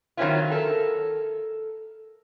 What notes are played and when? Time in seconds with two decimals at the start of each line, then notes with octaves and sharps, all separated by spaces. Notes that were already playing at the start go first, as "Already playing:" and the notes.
0.17 D#3 F#3 C4 C#4 E4 F4
0.51 A4 A#4